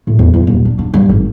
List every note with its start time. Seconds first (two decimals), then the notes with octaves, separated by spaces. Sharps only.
0.07 A2
0.19 E2
0.34 E2
0.47 D#1
0.65 D4
0.79 D4
0.94 G2
1.09 G#1